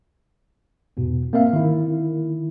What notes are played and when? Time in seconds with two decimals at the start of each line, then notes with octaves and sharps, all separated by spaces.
0.97 E2 G#2 B2
1.33 A#3 C4 A#4 E5 F5
1.53 D#3 E4